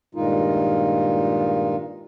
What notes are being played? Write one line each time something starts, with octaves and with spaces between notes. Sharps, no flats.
G2 A#2 D#3 G#3 D#4 F4